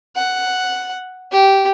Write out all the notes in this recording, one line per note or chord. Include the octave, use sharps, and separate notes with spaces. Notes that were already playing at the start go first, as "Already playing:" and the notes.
F#5
G4